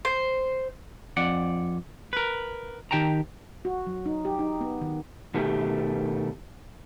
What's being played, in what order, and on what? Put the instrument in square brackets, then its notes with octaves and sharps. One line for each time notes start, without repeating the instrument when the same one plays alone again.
[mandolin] C5
[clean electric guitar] F2 D5 F#5
A#4 B4
D#3 G4 G5 A5 A#5
[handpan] F#4
F#3
D#4
G4
D#4
B3
D#3
[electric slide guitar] B2 D#3 A3 G4